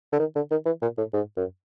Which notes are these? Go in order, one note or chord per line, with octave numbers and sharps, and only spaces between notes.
D3
D#3
D3
D#3
E3
A#2
A2
G#2
F#2